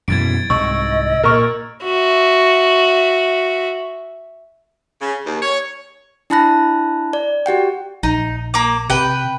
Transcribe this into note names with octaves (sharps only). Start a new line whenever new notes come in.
F#2 B2 E3 G#6 A6 D7
C2 G#2 D#5 C#6 E6
A#2 A#4 C#6 F6
F#4 E5
C#3
D#2
C#5
D4 E4 A5 B5 F#6 A#6
D5
F#4 G4 F#5 G5
A#1 D#4
A#3 D6
C3 B4 G5